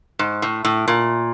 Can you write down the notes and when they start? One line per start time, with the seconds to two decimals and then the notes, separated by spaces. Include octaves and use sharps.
0.19 G#2
0.42 A2
0.65 A2
0.88 A#2